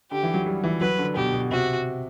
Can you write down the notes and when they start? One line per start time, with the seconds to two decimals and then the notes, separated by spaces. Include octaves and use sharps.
0.11 D3 G4
0.23 E3
0.34 F#3
0.46 G3
0.64 E3
0.81 F#3 B4
0.99 D3
1.16 B2 G4
1.33 B2
1.51 C3 F#4